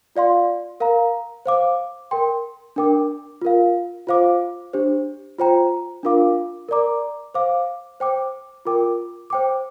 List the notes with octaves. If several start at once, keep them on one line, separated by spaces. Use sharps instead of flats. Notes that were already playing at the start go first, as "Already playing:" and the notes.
F4 D5 F5 C6
A#4 F5 A#5
C5 F5 D6
A#4 G5 C6
D4 A#4 G5 D6
F4 A#4 F5
F4 C5 F5 D6
D4 G4 C5
F4 C5 G5 A#5
D4 F4 A#4 F5 D6
A#4 D5 A#5 D6
C5 F5 D6
C5 G5 D6
F4 A#4 G5 D6
C5 G5 D6